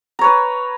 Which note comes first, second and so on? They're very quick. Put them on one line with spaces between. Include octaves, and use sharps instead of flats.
A#5 C#5 B4